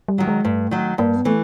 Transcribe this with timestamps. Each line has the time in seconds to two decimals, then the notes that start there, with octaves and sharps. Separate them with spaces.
0.08 G3
0.18 D#3 F#3
0.28 G#3
0.45 G2 A3
0.71 D#3 F#3
0.98 G2 A#3
1.17 B3
1.25 E3 A3